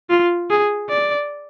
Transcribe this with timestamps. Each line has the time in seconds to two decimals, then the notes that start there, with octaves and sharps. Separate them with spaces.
0.10 F4
0.50 G#4
0.90 D5